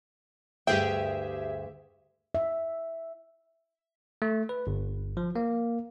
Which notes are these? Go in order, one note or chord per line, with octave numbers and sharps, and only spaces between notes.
D2 G2 G4 G#4 E5 G5
E5
A3
B4
G1
F3
A#3